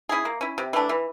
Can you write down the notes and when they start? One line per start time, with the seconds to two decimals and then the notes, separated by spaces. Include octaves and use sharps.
0.09 C#4 E4 G#4
0.25 A#3
0.41 C#4 E4
0.58 C3
0.73 E3 A3 D4
0.89 E3